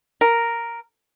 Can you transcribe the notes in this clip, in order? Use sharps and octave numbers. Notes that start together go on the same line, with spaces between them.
A#4